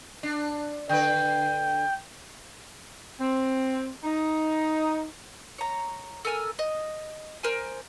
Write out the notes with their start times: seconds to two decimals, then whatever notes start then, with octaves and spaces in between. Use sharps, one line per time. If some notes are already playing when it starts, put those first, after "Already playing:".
0.23 D4
0.89 D3 B4 G5
3.20 C4
4.04 D#4
5.58 C#5 A#5
6.25 A4 A#4 G#5 E6
6.59 D#5
7.43 A#4 C5 G#5